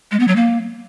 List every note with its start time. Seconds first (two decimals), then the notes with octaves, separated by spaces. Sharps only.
0.11 G#3
0.19 B3
0.28 F#3
0.36 A#3